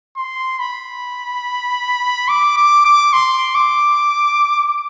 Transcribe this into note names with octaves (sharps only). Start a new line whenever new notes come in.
C6
B5
D6
D6
D6
C6
D6